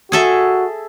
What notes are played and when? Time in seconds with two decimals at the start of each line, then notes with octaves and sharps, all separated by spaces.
0.12 F#4 G#4 A4 E5